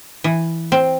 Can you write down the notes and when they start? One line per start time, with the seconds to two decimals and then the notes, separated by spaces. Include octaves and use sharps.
0.24 E3
0.72 C4